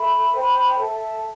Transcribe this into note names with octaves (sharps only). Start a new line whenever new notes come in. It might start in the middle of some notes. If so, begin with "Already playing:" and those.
Already playing: A4 E5 B5
C5 G5 B5
A4 E5 A5